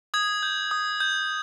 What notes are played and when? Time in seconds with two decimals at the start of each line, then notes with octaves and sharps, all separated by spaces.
0.14 D#6 G#6
0.43 G6
0.71 D#6
1.00 G6